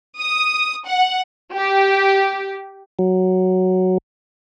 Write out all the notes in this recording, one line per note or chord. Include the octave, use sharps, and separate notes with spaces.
D#6
F#5
G4
F#3